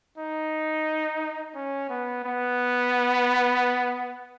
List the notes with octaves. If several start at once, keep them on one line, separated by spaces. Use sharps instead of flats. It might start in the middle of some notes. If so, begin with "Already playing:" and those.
D#4
C#4
B3
B3